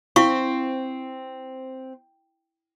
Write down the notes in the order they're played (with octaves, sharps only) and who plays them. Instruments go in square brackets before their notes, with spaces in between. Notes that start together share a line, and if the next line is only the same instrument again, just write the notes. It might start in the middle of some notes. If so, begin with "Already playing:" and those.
[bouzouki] C4 [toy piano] E4 F5 C#6